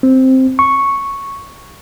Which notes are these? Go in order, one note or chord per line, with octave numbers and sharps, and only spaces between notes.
C4
C#6